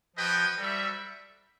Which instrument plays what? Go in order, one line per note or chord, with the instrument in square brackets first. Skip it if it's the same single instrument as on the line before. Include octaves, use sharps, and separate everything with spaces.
[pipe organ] F3 [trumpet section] F#4 B4 D#5 G5
[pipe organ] G3 [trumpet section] F#4 A4 C5 E5